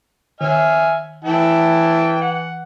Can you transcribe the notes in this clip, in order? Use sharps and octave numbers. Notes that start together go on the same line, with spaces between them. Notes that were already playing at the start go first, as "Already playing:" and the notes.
D#3 E5 G#5 F6
E3 E4 G5 A5
F#5